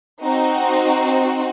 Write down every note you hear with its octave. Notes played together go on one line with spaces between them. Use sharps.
C4 D#4 F#4